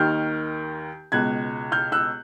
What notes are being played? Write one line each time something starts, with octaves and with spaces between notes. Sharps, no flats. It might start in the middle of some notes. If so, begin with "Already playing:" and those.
Already playing: D#2 D#3 F6 G6
C#2 B2 F#6 G#6
F6 G6
E6 F#6